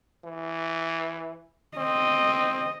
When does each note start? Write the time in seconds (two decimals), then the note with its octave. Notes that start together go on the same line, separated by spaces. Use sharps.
0.25 E3
1.78 C4 D#5